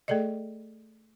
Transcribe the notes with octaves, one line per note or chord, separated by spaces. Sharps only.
A3 G#4 A4 D5 D#5